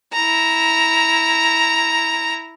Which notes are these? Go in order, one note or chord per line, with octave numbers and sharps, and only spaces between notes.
E4 A#5